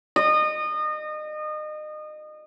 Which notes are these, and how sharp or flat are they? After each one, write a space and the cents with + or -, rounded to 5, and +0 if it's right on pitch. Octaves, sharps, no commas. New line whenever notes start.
D#5 -30